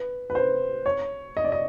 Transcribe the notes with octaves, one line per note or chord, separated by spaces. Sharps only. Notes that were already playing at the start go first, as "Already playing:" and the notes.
Already playing: B4
B4
C5
C#5
D#5
D5
D#5